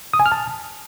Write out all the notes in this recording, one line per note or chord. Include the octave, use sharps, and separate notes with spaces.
D#6
G#5
F6
A5